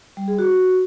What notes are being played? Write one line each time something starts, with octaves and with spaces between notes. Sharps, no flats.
G3
G#4
F#4